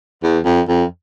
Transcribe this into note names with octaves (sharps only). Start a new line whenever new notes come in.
E2
F2
F2